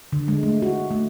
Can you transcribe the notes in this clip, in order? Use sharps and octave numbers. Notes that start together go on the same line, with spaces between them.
D3
G#3
A3
F#4
A3